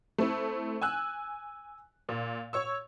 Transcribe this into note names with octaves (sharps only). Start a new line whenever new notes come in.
A3 C4 E4
G#5 E6 F#6
A#2
C#5 C#6 E6